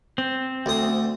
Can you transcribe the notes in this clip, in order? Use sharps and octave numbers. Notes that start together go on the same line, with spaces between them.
C4
D2 D#6